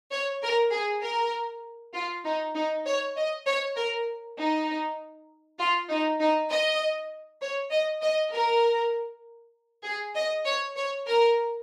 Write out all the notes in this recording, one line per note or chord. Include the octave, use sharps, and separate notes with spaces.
C#5
A#4
G#4
A#4
F4
D#4
D#4
C#5
D#5
C#5
A#4
D#4
F4
D#4
D#4
D#5
C#5
D#5
D#5
A#4
G#4
D#5
C#5
C#5
A#4